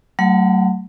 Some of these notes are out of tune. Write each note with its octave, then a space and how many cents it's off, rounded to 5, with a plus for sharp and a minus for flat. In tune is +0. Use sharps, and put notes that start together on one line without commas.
F#3 +40 A3 +30 F#5 -20